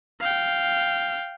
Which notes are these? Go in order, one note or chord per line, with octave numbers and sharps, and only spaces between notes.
F5 G5